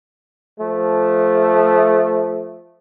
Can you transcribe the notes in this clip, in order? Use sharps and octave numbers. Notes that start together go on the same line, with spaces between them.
F3 A3